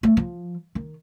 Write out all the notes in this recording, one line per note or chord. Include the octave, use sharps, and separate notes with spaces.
A3
F3
D#3